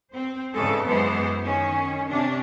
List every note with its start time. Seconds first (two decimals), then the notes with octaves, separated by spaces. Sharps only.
0.12 C4 C5
0.54 E2 G#2 C#3 G#3 A4
0.86 F#2 E3 G#3 B3 C5
1.44 D#3 C#4
2.09 C3 C#4 D4